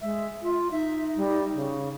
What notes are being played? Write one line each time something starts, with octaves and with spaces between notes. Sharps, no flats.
G#3 E5
F4
D#4 E5
G3
C#3